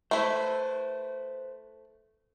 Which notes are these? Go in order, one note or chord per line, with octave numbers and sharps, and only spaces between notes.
A3 E4 B4 C5